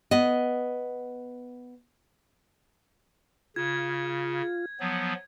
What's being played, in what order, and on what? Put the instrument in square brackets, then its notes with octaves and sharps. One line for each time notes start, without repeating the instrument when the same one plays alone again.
[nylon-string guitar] B3 D#5
[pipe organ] C#3 [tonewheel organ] F4 [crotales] G#6
[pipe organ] F3 F#3 B3